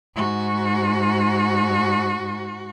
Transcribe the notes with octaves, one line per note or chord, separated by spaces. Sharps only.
G#2 F#4